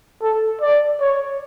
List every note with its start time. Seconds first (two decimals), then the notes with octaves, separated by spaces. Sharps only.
0.22 A4
0.61 D5
1.00 C#5